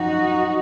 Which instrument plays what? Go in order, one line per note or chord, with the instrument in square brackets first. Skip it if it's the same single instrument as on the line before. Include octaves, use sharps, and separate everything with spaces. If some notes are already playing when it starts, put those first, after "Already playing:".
Already playing: [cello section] F#2 F3 D#4 F#4